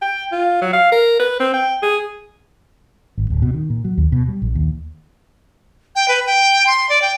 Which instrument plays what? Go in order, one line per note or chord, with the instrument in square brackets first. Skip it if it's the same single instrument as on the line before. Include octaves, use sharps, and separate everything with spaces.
[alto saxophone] G5
F4
F#3
F5
A#4
B4
C4
G5
G#4
[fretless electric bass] G#1
D1
B2
D#3
A#2
F#3
D#2
B2
G3
A#1
D#2
[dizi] G5
B4
G5
C6
D5
G5